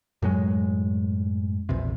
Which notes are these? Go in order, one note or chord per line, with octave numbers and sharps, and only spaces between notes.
F#2 A2 F#3 G#3
A#1 E2 C3